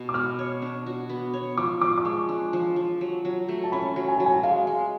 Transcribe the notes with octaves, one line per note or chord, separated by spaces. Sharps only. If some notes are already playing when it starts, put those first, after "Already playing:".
Already playing: B2
D6
B3 F6
C#5
D4
F#4
B3
C#5
F3 D6
F3 D6
D6
G#3 C#6
D4
F3
F3
F#3
F#3
A3
A5
C#4 B5
F#3
G#5
F#3 A5
G#5
G#3 F5
G#3